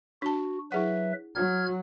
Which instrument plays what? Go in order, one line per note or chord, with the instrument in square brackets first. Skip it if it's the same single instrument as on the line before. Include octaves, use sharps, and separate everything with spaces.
[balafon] D4 A5 [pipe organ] F#4
[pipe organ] F#3 B4 E5 [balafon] E4 G#4 F#5
[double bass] F#3 [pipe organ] F6 G#6